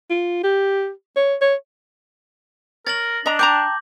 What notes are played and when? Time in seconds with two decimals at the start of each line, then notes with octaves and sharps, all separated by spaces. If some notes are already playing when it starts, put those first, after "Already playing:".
0.10 F4
0.43 G4
1.16 C#5
1.41 C#5
2.87 A#4 C#5 A6 A#6 F#7
3.26 D4 D#5 A#5
3.39 G5 A5 A#5 D6 G6